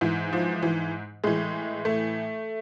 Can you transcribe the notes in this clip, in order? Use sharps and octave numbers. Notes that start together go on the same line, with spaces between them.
G#2 E3
F3
E3
A2 E3 G#3
A3